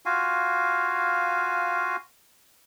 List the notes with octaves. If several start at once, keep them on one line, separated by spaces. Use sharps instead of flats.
F4 F#4 F5 G#5